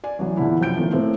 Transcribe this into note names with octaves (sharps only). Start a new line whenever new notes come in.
D5 G#5
A1 F#3
E2 A#2 D3 E4
C2 F#2 F3 G5 G6 D7
A1 B2 D#3 F3 A3
A2 A3 A#3 C4